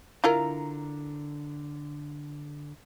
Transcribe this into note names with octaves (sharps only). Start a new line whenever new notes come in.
D3 E4 F4 A#4 A#5